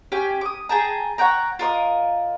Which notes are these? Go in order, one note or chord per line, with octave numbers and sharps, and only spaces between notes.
C#4 G4 G5 G#5
D6 D#6
G#4 G5 A5 A#5
C#5 F#5 G5 A#5
F4 A#4 D5 D#5